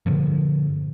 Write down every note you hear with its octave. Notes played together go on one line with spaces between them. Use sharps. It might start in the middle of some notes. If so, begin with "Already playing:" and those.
G2 A#2 D3 F3